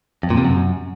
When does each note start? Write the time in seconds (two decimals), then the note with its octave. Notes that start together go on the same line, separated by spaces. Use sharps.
0.23 F2
0.30 A#2
0.37 C3
0.45 F#2